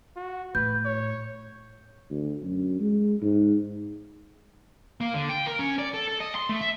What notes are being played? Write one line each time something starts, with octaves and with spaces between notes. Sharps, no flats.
F#4
A2 B4 G6
C#5
D2
F#2
G#3
G#2
A#3
D3
G5
A#4
C#4
D5
A4
A4
D#5
C6
A3
E5